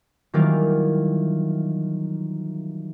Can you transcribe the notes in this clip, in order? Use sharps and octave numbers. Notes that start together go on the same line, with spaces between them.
D#3 E3 F#3 G3 A#3 F4